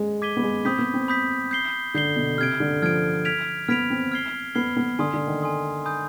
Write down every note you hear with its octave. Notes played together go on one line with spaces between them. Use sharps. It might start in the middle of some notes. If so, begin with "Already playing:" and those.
Already playing: G#3
D6 G#6 B6 D#7 G7
B3
G#3
C4 B5 D#6 G6 B6
B3
C4
B5 D#6 G6 B6
G6 C7 G7
D3 G6 C7 G7
B2
C3 F6 G#6 D7
D3
F3 F6 G#6 D7
F6 G#6 B6 D7 F7
B3 F6 G#6 B6 D7 F7
C4
F6 G#6 C7 G7
B3 F6 G#6 C7 G7
B3
D3 G#5 C6 D#6
D3
D#3
G#5 C6 D#6
G#5 B5 D#6 G6